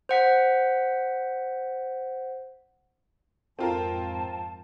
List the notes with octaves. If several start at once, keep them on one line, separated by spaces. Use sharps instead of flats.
C5 F#5 B6
F2 G#2 C4 F4 A#4 A5